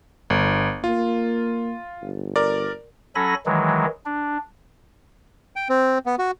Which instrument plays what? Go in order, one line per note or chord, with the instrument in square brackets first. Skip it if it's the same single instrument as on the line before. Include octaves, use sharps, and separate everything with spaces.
[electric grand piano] G1
[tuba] A#3 [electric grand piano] F4
[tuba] G1
[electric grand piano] A#4 D5
[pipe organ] F#3 C#4 A4 G#5 B5 A#6
D#3 E3 F#3 G#3
D4
[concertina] G5
C4
B3
F#4